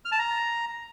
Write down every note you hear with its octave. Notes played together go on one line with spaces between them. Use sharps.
F6
A5
A#5